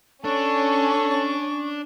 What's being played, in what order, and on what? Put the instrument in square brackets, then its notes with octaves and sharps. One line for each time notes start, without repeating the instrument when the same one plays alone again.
[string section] C#4 [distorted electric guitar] D4 [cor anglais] A4 [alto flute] C#6